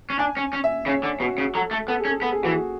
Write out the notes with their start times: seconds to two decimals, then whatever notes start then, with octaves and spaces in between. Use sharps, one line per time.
0.10 C#4
0.19 D4 G#5
0.37 C#4
0.53 C#4
0.64 E5
0.86 C#3 C#5
1.03 D3
1.20 B2 F#4
1.38 C#3
1.55 F#3 A4
1.71 A3
1.88 B3 A4
1.99 G#4
2.05 C#4
2.09 A4
2.21 B3 A4
2.32 G#4
2.43 E3 F#4
2.53 G#4